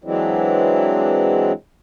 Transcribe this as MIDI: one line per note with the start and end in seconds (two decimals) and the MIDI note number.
0.04 1.52 52
0.04 1.52 54
0.04 1.52 56
0.04 1.52 60
0.04 1.52 62
0.04 1.52 64